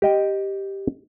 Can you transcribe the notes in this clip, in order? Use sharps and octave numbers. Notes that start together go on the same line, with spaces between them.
G4 D#5 G5